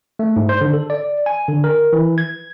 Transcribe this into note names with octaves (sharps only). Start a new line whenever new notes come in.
A3
G#2
C5
D3
A4
D5
G#5
D3
A#4
E3
G#6